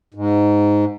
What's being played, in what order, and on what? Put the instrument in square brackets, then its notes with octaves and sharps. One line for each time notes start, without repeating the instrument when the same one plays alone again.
[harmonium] G#2